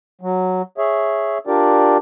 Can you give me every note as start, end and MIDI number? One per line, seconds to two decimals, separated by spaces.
0.21 0.62 54
0.78 1.38 68
0.78 1.38 73
0.78 1.38 76
1.47 1.97 62
1.47 1.97 65
1.47 1.97 67
1.47 1.97 70
1.47 1.97 74